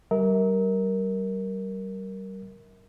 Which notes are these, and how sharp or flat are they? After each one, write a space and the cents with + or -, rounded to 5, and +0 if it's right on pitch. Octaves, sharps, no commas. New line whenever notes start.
G3 -30 A#4 +0 E5 -40